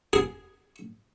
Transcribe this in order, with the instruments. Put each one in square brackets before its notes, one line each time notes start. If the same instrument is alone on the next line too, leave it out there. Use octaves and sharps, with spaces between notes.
[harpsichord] G#4